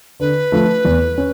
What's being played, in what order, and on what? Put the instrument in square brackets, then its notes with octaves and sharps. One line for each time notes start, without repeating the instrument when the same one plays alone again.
[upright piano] D3 [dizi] B4
[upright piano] F3 A3
E2
C#4